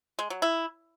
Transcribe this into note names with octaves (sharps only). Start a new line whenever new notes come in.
G#3
F#3
E4